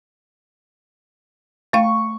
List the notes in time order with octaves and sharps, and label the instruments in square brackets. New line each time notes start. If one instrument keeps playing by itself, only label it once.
[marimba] A3 F5 [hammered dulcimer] C#6